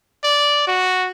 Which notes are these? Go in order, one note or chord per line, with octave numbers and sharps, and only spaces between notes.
D5
F#4